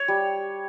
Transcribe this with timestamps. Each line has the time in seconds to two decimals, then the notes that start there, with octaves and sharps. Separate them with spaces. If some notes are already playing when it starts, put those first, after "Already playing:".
Already playing: C#5
0.08 G3